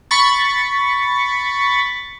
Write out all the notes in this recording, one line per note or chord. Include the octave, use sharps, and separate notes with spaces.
B5 C#6 A6